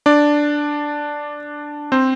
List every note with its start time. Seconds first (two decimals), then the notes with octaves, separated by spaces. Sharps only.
0.06 D4 D5
1.92 C4 C5